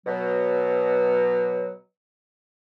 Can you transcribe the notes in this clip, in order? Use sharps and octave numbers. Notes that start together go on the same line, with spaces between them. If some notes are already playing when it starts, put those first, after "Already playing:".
B2 F#3